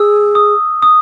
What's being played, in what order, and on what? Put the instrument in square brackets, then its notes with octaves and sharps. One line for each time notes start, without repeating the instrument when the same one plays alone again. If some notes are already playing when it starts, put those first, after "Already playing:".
Already playing: [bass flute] G#4 [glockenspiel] E6
[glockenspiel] D#6
D#6